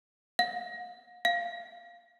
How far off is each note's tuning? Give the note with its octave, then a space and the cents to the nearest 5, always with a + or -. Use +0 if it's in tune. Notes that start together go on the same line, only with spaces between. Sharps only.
F5 +40
F5 -5